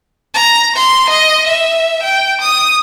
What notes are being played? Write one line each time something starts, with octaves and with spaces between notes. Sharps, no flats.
A#5
C6
D#5
E5
G5
D#6